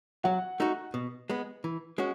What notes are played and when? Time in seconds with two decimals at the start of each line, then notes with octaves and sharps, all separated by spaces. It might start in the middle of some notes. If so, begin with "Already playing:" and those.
0.24 F#3 F#5
0.60 A3 D#4 F#4
0.94 B2
1.30 G#3 B3
1.64 E3
1.98 G#3 C#4 F#4